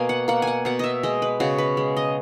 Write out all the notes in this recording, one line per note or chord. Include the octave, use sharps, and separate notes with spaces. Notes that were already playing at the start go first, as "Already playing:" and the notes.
Already playing: B2 A#3 G#5
F#5
A#3 F#5
G#5
F#5
B2 F#5
D#5 E5
G#3 D#5
B4
C#3 F#4
B4
G#3
D#5